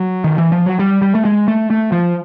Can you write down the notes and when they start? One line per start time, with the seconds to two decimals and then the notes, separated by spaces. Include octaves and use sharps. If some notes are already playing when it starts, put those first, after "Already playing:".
Already playing: F#3
0.24 D#3
0.38 E3
0.52 F3
0.66 F#3
0.79 G3
1.02 G3
1.15 A3
1.25 G#3
1.48 A3
1.70 A3
1.92 F3